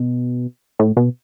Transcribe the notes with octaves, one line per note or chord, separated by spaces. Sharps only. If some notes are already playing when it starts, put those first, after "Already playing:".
Already playing: B2
A2
B2